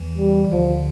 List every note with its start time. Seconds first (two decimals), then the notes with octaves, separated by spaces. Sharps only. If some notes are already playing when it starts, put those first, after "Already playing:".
Already playing: E2 E3
0.18 G3
0.45 D#3
0.51 D2 D3 F3